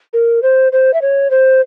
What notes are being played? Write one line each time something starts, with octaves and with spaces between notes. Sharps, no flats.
A#4
C5
C5
E5
C#5
C5